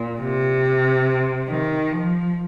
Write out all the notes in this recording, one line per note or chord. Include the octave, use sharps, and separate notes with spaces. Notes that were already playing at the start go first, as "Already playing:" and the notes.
Already playing: A#2
C3
D#3
F3